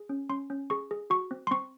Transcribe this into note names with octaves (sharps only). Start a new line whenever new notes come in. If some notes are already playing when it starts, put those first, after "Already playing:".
Already playing: G#4
C#4
C#4 C6
C#4
G#4 C#6
G#4
F#4 C#6
C4
C6
C4 C#6